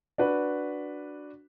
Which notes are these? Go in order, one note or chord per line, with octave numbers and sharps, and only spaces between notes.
D4 F#4 B4